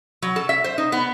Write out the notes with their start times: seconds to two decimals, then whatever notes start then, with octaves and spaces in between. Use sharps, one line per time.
0.22 F#3
0.36 A4
0.49 E5
0.64 C5
0.78 D#4
0.92 B3